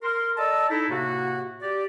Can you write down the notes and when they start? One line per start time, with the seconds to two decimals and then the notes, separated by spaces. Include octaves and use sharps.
0.03 A#4 C6
0.37 A4 D5 D#5 A5 A#5 E6
0.70 D#4 E4 A4
0.90 A2 C3 A#3 F#4
1.61 G4 D5